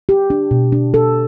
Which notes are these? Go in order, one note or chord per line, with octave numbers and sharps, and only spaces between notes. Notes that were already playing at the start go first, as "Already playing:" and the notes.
G4
D4
B2
D4
A4